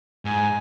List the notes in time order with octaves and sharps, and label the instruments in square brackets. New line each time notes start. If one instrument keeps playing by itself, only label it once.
[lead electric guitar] G#2 [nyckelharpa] G#5